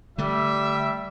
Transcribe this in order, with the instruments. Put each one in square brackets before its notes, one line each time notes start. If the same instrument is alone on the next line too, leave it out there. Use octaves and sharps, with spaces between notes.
[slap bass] D3 A3 [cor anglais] G3 [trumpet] E5